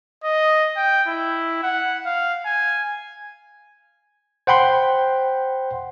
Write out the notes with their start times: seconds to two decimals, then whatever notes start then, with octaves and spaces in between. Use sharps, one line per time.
0.24 D#5
0.77 G5
1.07 E4
1.63 F#5
2.06 F5
2.46 G#5
4.47 C5 F#5 G5 B5 C6